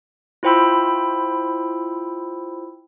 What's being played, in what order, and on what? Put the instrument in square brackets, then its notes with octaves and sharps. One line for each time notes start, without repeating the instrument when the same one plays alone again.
[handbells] E4 F4 C5 G5 B5 E6